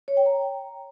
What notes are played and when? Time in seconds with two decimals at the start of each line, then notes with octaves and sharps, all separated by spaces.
0.08 C#5
0.17 G5
0.26 A#5